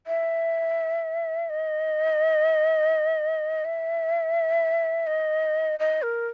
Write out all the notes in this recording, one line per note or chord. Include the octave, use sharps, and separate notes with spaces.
E5
D#5
E5
D#5
D#5
A#4